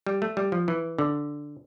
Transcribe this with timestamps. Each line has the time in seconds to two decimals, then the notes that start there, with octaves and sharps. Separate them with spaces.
0.06 G3
0.22 A3
0.37 G3
0.52 F3
0.68 E3
0.98 D3